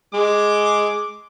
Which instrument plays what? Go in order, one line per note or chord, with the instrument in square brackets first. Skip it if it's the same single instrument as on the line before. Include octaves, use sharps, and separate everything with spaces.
[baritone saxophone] G#3 [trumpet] D6